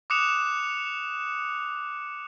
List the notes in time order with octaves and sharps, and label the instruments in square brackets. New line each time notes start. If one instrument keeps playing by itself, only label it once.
[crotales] D6 D#6 F#6 C#7 E7 F7